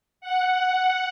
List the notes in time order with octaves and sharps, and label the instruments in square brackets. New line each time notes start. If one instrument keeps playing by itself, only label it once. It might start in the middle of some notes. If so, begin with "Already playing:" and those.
[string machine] F#5